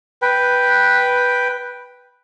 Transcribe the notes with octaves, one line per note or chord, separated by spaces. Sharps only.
B4 G5